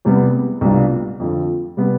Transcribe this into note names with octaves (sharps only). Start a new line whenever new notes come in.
E2 C3 G3 B3
C2 B2 G3 D4 F4
F2 D3 F3
C3 G3 B3